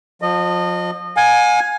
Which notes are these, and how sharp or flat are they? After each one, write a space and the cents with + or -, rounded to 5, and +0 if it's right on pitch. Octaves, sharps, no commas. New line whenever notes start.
F3 +30 D#5 -25
F5 +40 G#5 +0